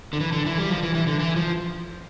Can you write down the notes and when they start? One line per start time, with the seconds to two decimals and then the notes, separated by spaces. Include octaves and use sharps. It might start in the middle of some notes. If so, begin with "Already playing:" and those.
0.13 D3
0.20 E3
0.33 D3
0.46 E3
0.58 G3
0.70 F3
0.83 E3
0.95 E3
1.07 D3
1.20 E3
1.36 F3